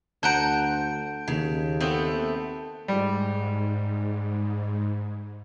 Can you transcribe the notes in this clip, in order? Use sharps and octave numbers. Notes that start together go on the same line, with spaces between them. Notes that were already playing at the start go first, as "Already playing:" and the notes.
D2 C5 F#5 A5 A#5 G6 D7
D#2 C#3
A3 B3 C4
G#2 G3